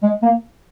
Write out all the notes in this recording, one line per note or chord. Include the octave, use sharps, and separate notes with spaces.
G#3
A#3